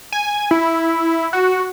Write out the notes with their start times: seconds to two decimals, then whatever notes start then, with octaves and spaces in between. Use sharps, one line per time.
0.13 G#5
0.51 E4
1.33 F#4